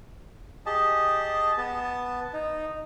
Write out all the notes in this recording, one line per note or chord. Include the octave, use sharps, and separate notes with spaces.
G4 G#4 D#5 A5
B3 A5
D#4